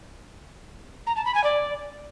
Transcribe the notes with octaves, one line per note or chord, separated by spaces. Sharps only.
A#5
A5
B5
G#5
D5